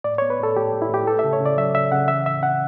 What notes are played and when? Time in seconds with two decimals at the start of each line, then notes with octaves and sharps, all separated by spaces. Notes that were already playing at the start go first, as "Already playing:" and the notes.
0.04 A2 D5
0.18 B3 C#5
0.30 B4
0.40 A2 A4
0.56 A2 G4
0.73 A2
0.82 E4
0.90 A2 G4
1.06 A3 A4
1.19 E5
1.24 C#3
1.33 C#5
1.40 C#3
1.46 D5
1.57 F#3 E5
1.75 C#3 E5
1.92 C#3 F#5
2.08 E3 E5
2.26 A2 E5
2.42 C#4 F#5